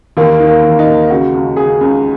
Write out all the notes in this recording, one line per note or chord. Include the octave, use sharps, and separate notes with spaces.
D#2 A#3
D#3
A#3
D#2
D#4
D#2
C#3 F#4
C#2
C#3 G#4
C#2